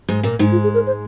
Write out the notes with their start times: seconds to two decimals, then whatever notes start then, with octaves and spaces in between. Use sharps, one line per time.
0.09 G#2 G#3
0.23 A#2 A#3
0.39 G#2 G#3 D#4
0.51 F4
0.63 G#4
0.74 A#4
0.86 C5